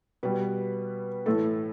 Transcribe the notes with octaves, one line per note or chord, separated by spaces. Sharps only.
B2 G3 B4
A2 E3 A3 A4